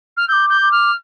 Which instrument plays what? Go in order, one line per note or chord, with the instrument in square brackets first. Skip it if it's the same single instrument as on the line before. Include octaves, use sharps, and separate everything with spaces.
[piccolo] F6
[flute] E6 [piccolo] G6
[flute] D6
[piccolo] G6
[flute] D6
[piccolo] F6